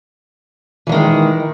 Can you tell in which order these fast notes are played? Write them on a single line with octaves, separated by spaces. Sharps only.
E3 F#3 D#3 G#3